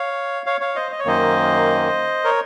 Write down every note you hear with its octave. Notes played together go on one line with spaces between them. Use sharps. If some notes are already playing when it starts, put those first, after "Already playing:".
Already playing: C#5 F5
C#5 F5
C#5 F5
C5 D#5
D#5
C#5
F#2 D#3 A#3 C5 D#5
A#4 C#5